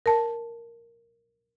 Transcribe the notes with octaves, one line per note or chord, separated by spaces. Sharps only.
A#4 A5